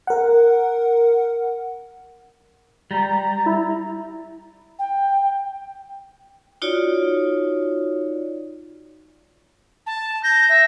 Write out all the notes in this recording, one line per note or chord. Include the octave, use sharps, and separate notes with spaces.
A#4 F#5
G3 A#5
E4
G5
D#4 F4 F#4 C#5 D5
A5
G6 A#6
E5